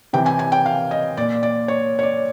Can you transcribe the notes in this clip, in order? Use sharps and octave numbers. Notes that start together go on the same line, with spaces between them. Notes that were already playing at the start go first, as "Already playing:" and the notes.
C3 E3 G5
G#5
G#5
G5
F5
D#5
A#2 D5
D5
C#5
C#5
D5